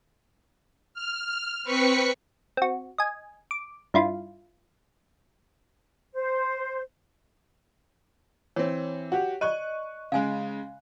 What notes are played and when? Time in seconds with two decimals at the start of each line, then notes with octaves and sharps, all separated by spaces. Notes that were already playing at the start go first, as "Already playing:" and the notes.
0.94 F6
1.63 C4 B4 C#6 B6 C#7
2.57 C4 F#4
2.98 D#5 G#5
3.51 D6
3.94 G2 E4 F4
6.14 C5
8.56 E3 C4 C#5
9.12 F#4 G4
9.41 D5 D#5 C#6 F#6 D#7
10.12 C#3 G#3 F5 G#5